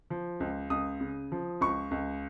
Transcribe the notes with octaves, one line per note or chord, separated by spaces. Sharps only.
F3
C#2
C#2 D#6
C#3
F3
C#2 C#6
C#2